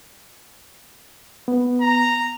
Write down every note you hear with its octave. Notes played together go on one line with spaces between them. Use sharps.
B3
A#5